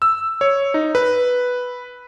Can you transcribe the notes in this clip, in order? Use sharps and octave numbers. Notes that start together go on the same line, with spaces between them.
E6
C#5
D#4
B4